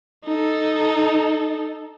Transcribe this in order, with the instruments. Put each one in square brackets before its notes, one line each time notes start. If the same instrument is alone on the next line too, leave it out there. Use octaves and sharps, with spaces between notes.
[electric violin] D#4 A4